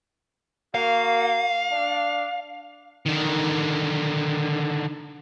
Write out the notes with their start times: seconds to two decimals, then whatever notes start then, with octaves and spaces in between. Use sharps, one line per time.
0.75 A#3 F#4 F5
1.71 D4
3.06 D3 D#3